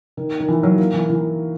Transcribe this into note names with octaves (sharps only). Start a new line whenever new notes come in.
D#3
D#3
E3
F#3
A#3
E3
E3